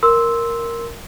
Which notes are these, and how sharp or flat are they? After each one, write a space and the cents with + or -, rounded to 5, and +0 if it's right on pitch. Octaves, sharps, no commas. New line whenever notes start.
A#4 +0 C6 +0 E6 -10